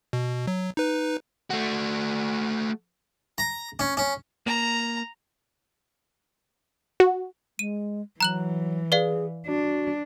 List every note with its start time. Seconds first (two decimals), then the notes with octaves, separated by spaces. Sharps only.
0.13 B2
0.47 F#3
0.77 D#4 B4
1.50 A3 F#4
3.38 A#5
3.79 C#4
3.97 C#4
4.47 A#3 A#5
7.00 F#4
7.59 G#3 D#7
8.20 E3 F#3 A#5 F#6 F#7
8.92 G#4 B4 D5 F5
9.47 D4 F#4